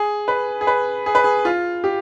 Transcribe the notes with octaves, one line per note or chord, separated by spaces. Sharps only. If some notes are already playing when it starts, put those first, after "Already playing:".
Already playing: G#4
B4
G#4
B4
G#4
B4
G#4
F4
G4